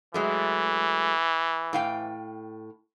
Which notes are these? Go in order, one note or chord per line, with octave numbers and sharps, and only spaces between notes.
E3 F#3 G#3 A3
A2 F5 G5